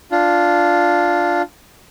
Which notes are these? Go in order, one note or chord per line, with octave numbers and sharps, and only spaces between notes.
D4 F4